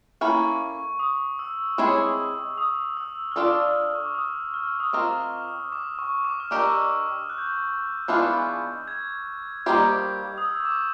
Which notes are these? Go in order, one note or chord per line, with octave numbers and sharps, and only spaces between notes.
A#3 C#4 E4 A4 C#6
D#6
E6
G#3 C4 E4 G#4 C#5 E6
D#6
E6
F6
D4 F4 A4 D5 E6
C#6
D6
D#6
F6
E6
D#6
C4 F4 A#4 D#5 D6
D6
C#6
D6
F6
D4 G4 A#4 D#5 E6
F#6
G6
F#6
E3 G#3 B3 D4 F4
G#6
G3 A#3 D#4 G4 C5 G6
D#6
E6
C#6
D6